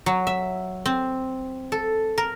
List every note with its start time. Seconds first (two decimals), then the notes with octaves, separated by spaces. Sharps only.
0.06 F#3
0.27 E5
0.86 C4
1.72 A4
2.18 A#4